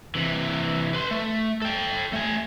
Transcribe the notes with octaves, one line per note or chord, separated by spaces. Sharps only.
C3 E3
B4 C6
A3
A4 G5
A3 G#5